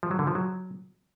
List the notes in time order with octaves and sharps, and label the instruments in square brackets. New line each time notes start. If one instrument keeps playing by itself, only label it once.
[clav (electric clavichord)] F3
F#3
D3
F3
F#3